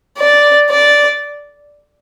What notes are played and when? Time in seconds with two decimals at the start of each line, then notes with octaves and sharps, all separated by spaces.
0.19 D5
0.70 D5